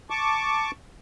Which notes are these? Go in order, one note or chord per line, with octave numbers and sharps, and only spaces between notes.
A5 C#6 D6